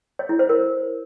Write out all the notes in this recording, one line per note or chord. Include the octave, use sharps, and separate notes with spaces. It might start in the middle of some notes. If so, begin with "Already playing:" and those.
C#5
E4
C5
A#4